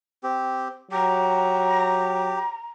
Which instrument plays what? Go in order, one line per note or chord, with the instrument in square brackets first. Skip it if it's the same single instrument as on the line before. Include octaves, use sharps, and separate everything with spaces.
[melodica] C4 G4
[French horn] F#3 [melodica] G4 [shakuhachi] A#5